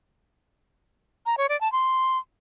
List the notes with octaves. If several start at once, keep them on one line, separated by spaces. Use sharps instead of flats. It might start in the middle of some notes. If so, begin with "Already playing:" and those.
A#5
C#5
D5
A5
C6